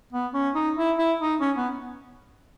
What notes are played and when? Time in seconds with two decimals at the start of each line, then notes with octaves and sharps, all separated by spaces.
0.13 B3
0.34 C#4
0.55 D#4
0.77 E4
0.98 E4
1.20 D#4
1.41 C#4
1.57 B3